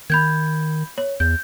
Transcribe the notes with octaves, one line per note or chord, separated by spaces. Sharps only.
D#3 B5 G6 G#6
C#5
E2 G6